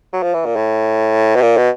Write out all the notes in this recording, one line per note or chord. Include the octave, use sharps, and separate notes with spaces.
F#3
F3
E3
A#2
A2
B2
A#2
B2